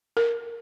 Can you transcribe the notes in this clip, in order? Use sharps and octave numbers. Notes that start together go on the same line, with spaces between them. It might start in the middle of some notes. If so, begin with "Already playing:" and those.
A#4